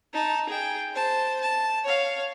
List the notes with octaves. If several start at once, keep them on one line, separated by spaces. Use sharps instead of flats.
D#4 A5
G#4 G5
C5 A5
A5
C#5 F5